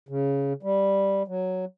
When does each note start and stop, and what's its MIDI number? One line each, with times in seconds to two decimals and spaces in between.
0.09 0.53 49
0.63 1.23 55
1.28 1.65 54